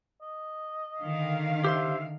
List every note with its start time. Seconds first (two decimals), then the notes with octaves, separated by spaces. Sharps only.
0.22 D#5
1.02 D3 D#3 F5
1.64 G4 C5 E5 C6